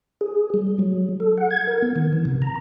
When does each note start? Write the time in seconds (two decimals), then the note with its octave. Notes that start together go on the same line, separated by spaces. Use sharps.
0.21 G#4
0.54 G3
0.79 F#3
1.20 A4
1.38 F#5
1.50 G#6
1.67 A#4
1.82 B3
1.96 D#3
2.13 E3
2.25 C3
2.42 A#5